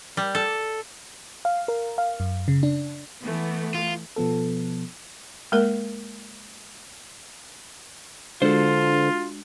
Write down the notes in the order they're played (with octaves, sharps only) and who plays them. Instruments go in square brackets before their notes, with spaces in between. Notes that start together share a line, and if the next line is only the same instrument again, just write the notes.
[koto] G3
A4
[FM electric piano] F5
A#4
F5
F#2
C#3
D4
[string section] E3 A3 B3
[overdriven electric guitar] F4
[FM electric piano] B2 F3 B3 A4
[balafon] G#3 A#3 A#4
[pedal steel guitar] D3 [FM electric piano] G#3 D4 F#4 [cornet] F4 [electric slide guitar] A4 C5